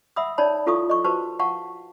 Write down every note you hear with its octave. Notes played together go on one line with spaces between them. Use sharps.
E5 F#5 B5 D#6 E6
D#4 C#5 D5 A5 B5
E4 F4 A4 F5 C#6 D#6
D#5 C#6
F#4 B4 C5 A5 C#6
F5 F#5 A5 C#6